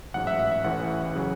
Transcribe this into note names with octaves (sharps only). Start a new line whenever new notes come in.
A1 G#2 F#3 F#5
E5
E5
E5
A1 A2 E3 F#5
C#3 F#3